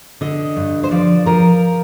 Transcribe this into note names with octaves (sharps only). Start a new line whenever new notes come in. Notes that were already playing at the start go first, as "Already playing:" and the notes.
D3 D#5
G2
C5
F3 D5
F3 A#4